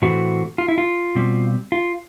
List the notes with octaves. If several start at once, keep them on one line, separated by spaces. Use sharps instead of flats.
A2 E3 A3 C4 F#4
F4
E4
F4
B2 G3 C4
F4